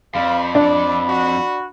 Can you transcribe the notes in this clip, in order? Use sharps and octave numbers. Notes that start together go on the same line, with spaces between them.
F2 C5 D5 F5 B5
D4 D5 B5
F#4